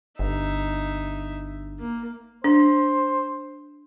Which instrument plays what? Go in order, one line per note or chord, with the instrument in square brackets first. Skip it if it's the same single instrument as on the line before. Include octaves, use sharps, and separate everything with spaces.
[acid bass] G1 [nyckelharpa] D#4 E5
[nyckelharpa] A#3
[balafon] D4 [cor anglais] C5